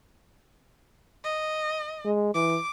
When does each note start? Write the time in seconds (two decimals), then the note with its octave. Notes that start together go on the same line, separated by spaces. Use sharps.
1.24 D#5
2.05 G#3
2.35 E3 D6